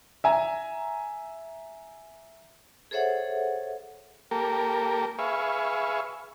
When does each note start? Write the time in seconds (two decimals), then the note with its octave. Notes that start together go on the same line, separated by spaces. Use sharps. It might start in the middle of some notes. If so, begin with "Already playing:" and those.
0.24 E5 G#5 A#5
2.91 G#4 A4 C5 C#5 E5 F#5
4.31 A#3 G4 A4 A#4
5.19 G#4 B4 E5 F5 C#6